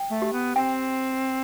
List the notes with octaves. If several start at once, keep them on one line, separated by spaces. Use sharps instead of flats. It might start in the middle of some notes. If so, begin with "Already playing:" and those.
Already playing: G5
A3
G4
B3
C4 G5